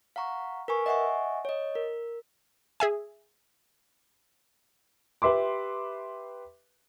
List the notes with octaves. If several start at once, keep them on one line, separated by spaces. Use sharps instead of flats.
F5 F#5 A#5 C#6
A#4 B4 G#5 C#6
D#5 E5 F#5 G#5 C#6
C#5 D#5
A#4
G#4 E5 G#5
G4 B4 E5 C6 D6